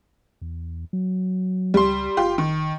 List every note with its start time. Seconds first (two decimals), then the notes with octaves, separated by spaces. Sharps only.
0.41 E2
0.93 F#3
1.74 C#2 G3 C6
2.17 F#1 F4 G4 C6
2.38 F1 D#3